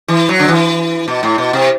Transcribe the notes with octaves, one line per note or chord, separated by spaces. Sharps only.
E3
F#3
D3
E3
B2
A2
B2
C3